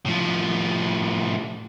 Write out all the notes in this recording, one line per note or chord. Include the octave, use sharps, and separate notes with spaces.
A2 F3